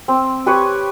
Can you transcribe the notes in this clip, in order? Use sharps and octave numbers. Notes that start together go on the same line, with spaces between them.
C4
G4 B4 C#5 C#6